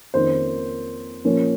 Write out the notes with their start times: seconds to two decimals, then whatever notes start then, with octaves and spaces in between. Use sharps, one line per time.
0.14 F2 D#3 A#3 C#4 C5
1.24 A#2 F3 A#3 C#4